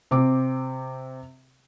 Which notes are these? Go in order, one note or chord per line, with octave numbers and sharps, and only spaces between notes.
C3 C4 D6